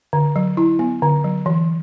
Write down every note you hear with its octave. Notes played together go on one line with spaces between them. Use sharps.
D3
F#3
E4
B3
D3
F#3
E3